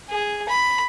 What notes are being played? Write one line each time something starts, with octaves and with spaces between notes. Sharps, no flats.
G#4
B5